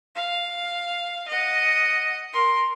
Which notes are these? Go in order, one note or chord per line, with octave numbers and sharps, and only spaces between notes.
F5
D#5 F#5
A#4 C6